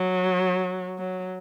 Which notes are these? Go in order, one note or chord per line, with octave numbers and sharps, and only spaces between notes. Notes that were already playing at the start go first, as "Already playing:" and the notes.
Already playing: F#3
F#3